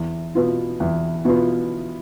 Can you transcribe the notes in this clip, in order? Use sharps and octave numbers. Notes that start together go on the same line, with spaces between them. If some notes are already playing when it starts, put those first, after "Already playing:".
Already playing: E2
B2 B3 F4
E2
B2 B3 F4